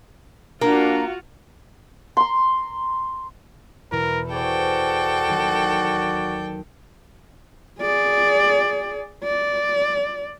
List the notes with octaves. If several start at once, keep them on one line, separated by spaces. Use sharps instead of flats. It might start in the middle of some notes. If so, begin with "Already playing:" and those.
A#3 D4 F4 F#4
A#5 C6
E2 B2 B3 A#4
F#4 G#4 A4 C5 D5 G5 C#6
D#2 F#3
G#4 D5
D5